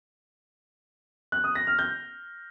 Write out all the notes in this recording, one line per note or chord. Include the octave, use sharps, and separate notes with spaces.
F#6
D#6
A#6
F6
G6